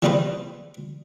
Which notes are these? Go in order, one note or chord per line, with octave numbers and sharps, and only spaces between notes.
E3 G3 A#3 G#4 B4 C5